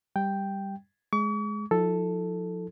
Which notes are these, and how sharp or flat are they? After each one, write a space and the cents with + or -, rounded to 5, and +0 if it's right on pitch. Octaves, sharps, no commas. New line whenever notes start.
G3 +5 G5 +0
G#3 +15 C#6 +45
F3 +30 E4 -35 A4 +0